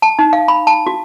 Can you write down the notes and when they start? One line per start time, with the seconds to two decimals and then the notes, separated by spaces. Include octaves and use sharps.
0.02 A5
0.19 D#4
0.33 F5
0.48 B5
0.67 A5
0.87 F#4